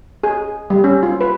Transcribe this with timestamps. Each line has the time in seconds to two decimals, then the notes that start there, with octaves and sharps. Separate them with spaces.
0.23 G#4
0.70 G3
0.84 C#4
1.03 F4
1.21 B4